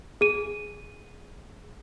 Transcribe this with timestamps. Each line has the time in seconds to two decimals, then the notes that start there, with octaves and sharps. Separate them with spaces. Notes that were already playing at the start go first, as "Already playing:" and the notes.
0.21 G#4 D#7